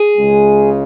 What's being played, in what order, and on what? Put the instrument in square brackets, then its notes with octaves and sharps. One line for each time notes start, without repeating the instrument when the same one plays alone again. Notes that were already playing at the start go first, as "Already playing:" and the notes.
Already playing: [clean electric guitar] G#4
[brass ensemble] C#2 C#3 G#3